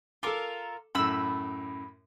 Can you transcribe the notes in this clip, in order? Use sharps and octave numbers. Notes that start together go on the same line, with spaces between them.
F4 A4 A#4 D6
F#2 A2 B5 E6